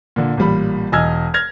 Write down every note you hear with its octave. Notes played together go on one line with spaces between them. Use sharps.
A#2 D3
A1 A#2 G3 B5
E1 D#5 G#5 E6 F6 G#6
F6 G#6 A#6 F7